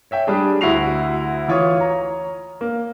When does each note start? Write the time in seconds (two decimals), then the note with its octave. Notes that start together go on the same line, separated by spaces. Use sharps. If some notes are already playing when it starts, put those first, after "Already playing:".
0.11 C#5 E5 G5
0.27 G3 D4 G#4
0.61 D2 E4 F#4 C7 F7
1.48 E3 F4 C#5 C#6 D#6
1.77 C#5 A#5
2.61 A#3